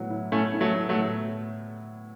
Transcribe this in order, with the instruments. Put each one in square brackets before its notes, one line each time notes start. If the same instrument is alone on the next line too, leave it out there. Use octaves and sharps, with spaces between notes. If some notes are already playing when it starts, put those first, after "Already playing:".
Already playing: [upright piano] A2 F#3 B3
E4
[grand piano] A3 C#4 [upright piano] E4
[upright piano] E4
[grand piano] F#3 A3
[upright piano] E4
[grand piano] F#3 A3
[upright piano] A2